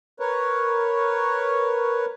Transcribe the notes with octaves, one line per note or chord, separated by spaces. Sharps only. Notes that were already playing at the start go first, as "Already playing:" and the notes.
A#4 B4 C#5